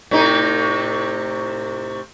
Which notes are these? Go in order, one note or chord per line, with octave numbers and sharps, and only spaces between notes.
A2 C3 D#4